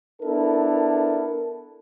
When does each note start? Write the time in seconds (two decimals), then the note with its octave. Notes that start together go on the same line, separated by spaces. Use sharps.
0.22 B3 D4 E4 A4 A#4